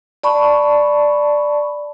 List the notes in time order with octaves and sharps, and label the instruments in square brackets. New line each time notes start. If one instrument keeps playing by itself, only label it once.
[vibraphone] D5 A5 B5 C#6